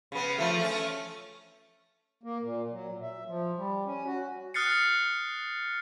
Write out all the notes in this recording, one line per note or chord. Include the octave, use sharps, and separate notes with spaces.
C#3 B3
F3 A3
A3 C#4
A#3
A#2
F#3
A#2
E5
F3
G3
C#4
F#4
D#6 F6 F#6 A6 C7 C#7